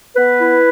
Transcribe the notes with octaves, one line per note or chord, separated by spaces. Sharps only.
B3 B4
E4